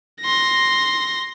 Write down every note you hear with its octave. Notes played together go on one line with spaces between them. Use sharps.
C6 A#6